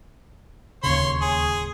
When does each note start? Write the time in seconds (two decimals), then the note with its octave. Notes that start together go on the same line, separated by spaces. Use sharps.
0.83 D1 D#2 C#3 C#5 C6
1.22 G#4